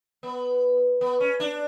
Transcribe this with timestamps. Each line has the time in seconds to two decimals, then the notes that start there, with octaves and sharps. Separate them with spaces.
0.23 B3
1.01 B3
1.20 C#4
1.40 D4